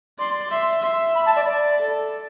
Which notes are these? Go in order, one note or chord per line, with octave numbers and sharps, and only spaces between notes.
D5 C6
E5 C6
E5 C6
B5
A5
D5
D5
A4